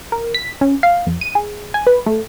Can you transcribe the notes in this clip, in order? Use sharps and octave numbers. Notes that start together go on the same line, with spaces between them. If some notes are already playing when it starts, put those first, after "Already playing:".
A#4
B6
C#4
F5
F2
D#7
G#4
G#5
B4
A3